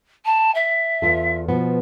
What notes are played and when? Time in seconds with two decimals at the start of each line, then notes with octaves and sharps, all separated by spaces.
0.25 A5
0.54 E5
1.02 E2 F4 A4
1.49 B2 F3 B3